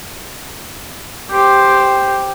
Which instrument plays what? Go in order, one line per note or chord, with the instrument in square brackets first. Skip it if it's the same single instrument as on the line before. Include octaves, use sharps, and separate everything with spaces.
[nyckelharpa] G4 C5